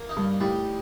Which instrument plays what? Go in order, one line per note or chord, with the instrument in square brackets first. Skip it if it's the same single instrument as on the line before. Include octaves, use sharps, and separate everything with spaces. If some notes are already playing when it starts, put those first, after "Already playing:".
Already playing: [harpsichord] A#3
D#4
[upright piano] G2
[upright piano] A2 [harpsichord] G3